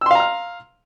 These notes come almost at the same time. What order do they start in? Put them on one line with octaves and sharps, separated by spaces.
E6 C6 F5 A#5 F6